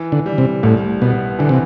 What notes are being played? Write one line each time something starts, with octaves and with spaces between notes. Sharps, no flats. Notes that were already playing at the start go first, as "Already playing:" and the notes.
Already playing: E3
D3
G3
C3
C2 A2
B2 B3
D3 E3
C3